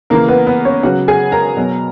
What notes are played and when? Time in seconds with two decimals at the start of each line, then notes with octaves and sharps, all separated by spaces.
0.10 C#3 E3 A#3 A#4
0.28 B3 B4
0.47 B3 B4
0.65 C#4 C#5
0.83 C#3 F#3 F#4 F#5
1.08 G#4 G#5
1.32 A#4 A#5
1.56 B2 F#3